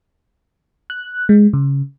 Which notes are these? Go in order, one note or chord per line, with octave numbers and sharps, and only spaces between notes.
F#6
G#3
C#3